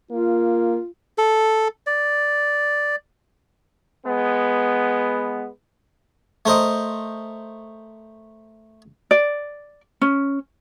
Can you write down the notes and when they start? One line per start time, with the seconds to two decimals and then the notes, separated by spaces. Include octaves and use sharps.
0.11 A#3 F4
1.18 A4
1.87 D5
4.05 G#3 B3
6.46 A3 A#4 C5 D#5
9.11 D5
10.01 C#4